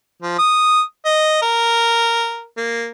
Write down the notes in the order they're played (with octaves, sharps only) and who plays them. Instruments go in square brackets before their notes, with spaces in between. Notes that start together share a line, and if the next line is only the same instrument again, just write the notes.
[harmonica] F3
D#6
D#5
A#4
A#3